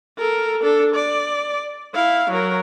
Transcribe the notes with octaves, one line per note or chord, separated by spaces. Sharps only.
A4 A#4
D4 A4
D5
E4 F5
F#3 A#4